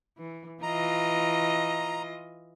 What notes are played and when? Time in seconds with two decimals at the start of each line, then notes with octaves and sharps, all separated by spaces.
0.18 E3
0.63 E3 F4 D#5 A#5